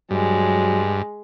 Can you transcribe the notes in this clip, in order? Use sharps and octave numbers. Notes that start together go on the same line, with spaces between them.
G2 F#3 G#3